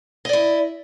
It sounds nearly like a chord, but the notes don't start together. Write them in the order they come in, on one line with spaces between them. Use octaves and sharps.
D#5 D5 E4